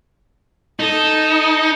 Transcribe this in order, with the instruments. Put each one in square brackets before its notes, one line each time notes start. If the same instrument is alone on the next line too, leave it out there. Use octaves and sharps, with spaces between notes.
[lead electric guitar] D#4 [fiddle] A4